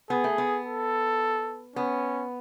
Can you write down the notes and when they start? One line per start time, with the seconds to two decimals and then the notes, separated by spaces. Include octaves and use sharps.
0.10 B3 G#4
0.24 A3
0.38 B3
0.66 A4
1.76 B3 C#4